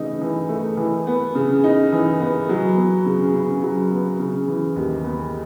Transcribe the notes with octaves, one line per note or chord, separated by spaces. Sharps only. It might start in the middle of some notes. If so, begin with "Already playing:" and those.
Already playing: C#3 E3 A3 D#4
E3
A3
E3
B3
C#3
D#4
E3
B3
F#3
B3
C#3
C#3
F#3
B3
C#3
E3
D#2
B3